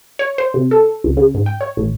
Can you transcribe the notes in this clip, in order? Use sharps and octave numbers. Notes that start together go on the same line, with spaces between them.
C#5
C5
C3
A4
C#2
C#3
G#2
G5
C#5
A1